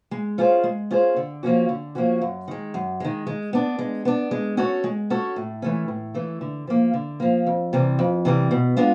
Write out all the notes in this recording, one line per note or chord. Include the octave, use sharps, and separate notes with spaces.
G#3
C#4 F4 G#4 C5
G#3
C#4 F4 G#4 C5
D3
F3 A#3 C#4 F#4
D3
F3 A#3 C#4 F#4
F#2
D#3 G#3
F#2
D#3 G#3
G#3
B3 D4
G#3
B3 D4
G#3
C#4 F#4 A4 C#5
G#3
C#4 F#4 A4 C#5
A2
E3 A3 C#4
A2
E3 A3 C#4
D3
F3 A#3
D3
F3 A#3
F2
C3 E3 G3
F2
C3 E3 G3
B2
G#3 B3 D4 F4